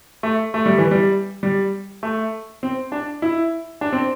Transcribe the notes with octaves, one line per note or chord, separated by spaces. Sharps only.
A3
A3
G3
E3
G3
G3
A3
C4
D4
E4
D4
C4